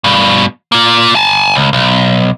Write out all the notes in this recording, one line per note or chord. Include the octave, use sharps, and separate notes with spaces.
G2 B2
A#3 F4
G#5 A5
C#2
B1